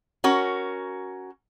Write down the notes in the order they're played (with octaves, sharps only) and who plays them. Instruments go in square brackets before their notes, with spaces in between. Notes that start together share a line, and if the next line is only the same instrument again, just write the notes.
[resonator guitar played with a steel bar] C#4 F#4 A#4